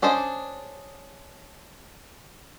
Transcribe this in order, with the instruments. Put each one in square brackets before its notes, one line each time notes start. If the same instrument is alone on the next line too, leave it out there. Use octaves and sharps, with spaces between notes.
[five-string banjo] C#4 D4 G#4 C5 D#5